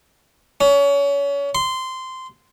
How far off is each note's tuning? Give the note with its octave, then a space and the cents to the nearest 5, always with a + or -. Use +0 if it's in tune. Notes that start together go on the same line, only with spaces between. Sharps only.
C#4 +30
C6 -15